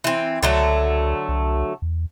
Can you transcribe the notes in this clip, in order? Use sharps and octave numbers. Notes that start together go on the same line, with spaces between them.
E3 C4
C#2 D3 F#3 A3
C2
E2